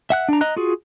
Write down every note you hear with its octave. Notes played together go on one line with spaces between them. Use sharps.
E5 F#5 F#6
D4 A#5
D#5 A#5 F#6
F4 F#4 G#4